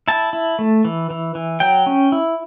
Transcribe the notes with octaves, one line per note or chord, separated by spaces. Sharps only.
E4 A5
E4
A3
E3
E3
E3
F#3 G5
C#4
E4